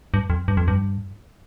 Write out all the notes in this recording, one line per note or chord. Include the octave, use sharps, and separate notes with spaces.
G2
F2
G2
F2
G2